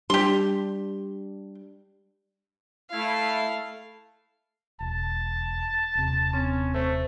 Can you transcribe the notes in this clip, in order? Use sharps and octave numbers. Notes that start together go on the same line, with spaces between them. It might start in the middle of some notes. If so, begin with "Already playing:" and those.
G3 D4 G4 C6
A3 E4 F5
E1 A5
D#1 C3
C4 C#4
A3 C5